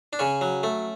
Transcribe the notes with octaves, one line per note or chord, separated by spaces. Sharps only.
D4
C#3 C#4
F#3
A3